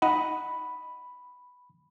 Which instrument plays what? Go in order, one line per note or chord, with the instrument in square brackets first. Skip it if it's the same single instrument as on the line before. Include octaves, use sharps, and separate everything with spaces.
[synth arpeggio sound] D#4 D#5 F#5 [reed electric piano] B5